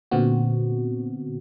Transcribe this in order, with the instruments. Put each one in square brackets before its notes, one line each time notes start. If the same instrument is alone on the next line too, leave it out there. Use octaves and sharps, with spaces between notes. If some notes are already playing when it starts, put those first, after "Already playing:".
[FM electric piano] A#2 D3 B3 C4 F#4